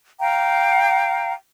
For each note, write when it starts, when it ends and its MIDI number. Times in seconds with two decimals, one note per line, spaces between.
0.20 1.33 77
0.20 1.33 79
0.20 1.33 82